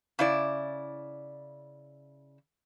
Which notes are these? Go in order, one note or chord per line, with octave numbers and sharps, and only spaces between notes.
C#3 E4 D5